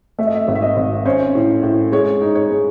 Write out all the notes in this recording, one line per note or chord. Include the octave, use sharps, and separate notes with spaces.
A3 E5
D#5
E5
G#1
E5
D#5
G#1
C#4 C5
A2
A2
G#3 C#5
D#4
C#5
G#3